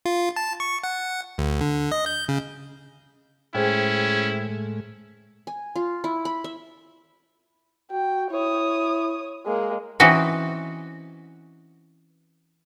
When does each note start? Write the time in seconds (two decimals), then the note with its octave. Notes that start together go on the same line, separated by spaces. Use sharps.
0.05 F4
0.36 A5
0.60 C#6
0.84 F#5
1.38 D2
1.61 D3
1.92 D#5
2.06 G6
2.28 C#3
3.55 A2 G#3 C#4 E4 G#4 C5 G5
5.47 G#5
5.75 F4
6.04 E4
6.25 B5
6.44 E5
7.91 F#4 G5
8.31 E4 C#5 D#6
9.46 G#3 A#3 G#4
10.00 E3 C4 C#4 D#4 F#4 B4